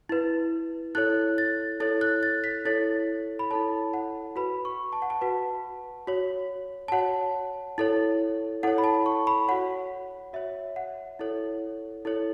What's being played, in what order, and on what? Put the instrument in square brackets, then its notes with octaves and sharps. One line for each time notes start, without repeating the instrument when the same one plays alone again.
[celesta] E4 B4
E4 A4 C#5 F#6
A6
E4 A4 C#5 A6
F#6
A6
B6
E4 A4 C#5 A6
B5
E4 A4 C#5 A5
F#5
F#4 B4 B5
C#6
A5
F#5
A5
F#4 B4 F#5
F#4 C#5
A5
F#4 C#5 F#5
E4 A4 C#5
E4 A4 C#5 F#5
B5
A5
C#6
B5
F#4 C#5 F#5
F#4 C#5 E5
F#5
E4 A4 C#5
E4 A4 C#5